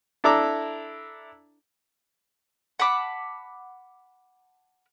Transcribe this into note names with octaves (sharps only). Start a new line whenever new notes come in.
D4 E4 A4 A#5 D6
F#5 A5 B5 D6